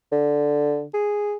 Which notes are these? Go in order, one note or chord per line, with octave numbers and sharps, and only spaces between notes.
D3
G#4